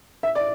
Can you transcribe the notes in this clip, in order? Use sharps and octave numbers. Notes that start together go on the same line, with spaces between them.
E5
D5